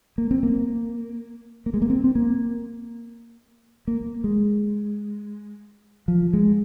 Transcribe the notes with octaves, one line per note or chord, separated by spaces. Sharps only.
A#3
C4
A#3
A#3
G#3
A#3
C4
C4
A#3
A#3
G#3
F3
G#3